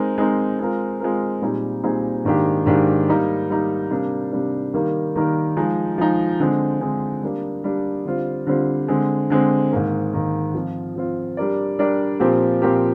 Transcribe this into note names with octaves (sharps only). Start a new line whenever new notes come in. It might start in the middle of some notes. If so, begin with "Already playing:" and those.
Already playing: G#3 C4 D#4 A#4
G#3 C4 D#4 A#4
G#3 C4 F4 A#4
G#3 C4 F4 A#4
A#2 G3 C4 D#4 G#4
A#2 G3 C4 D#4 G#4
G#2 D#3 A#3 D4 G4
G#2 D#3 A#3 D4 G4
G3 A#3 D#4
G3 A#3 D#4
C3 G3 A#3 D4
C3 G3 A#3 D4
D#3 G3 A#3 D#4 A#4
D#3 G3 A#3 D#4 A#4
F3 G#3 D#4
F3 G#3 D#4
D3 G#3 C4
D3 G#3 C4
G3 A#3 D4
G3 A#3 D4
D3 G3 C4 F4 C5
D3 G3 C4 F4 C5
D3 G#3 C4
D3 G#3 C4
G#2 D#3 A#3
G#2 D#3 A#3
F3 C4 F4
F3 C4 F4
G3 D4 G4 A#4 D5
G3 D4 G4 A#4 D5
A#2 F3 C4 G4 A#4
A#2 F3 C4 G4 A#4